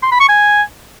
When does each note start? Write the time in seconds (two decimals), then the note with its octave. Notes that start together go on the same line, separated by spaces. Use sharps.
0.03 C6
0.12 B5
0.20 C#6
0.29 G#5